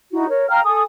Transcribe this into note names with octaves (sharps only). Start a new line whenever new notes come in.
D#4 E4 F#4
A#4 C#5
F5 G5 A#5 F6
A4 G#5 D#6